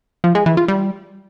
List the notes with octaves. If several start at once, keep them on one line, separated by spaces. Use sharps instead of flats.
F3
G#3
E3
F4
G3